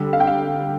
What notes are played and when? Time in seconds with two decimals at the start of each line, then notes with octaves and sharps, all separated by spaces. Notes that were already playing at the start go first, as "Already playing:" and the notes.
Already playing: D3 G3
0.13 F5
0.20 G5
0.27 F5